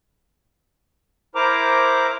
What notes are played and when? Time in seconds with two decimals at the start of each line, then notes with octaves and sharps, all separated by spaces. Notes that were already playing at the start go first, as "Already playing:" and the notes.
1.35 E4 A#4 C5 A#5 D6